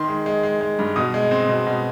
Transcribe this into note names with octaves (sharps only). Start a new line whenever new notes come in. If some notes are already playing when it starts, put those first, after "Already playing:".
Already playing: D#3 C6
G#3
G#3
G#3
G#3
G2
B2 D#6
G#3
C4
B2
B2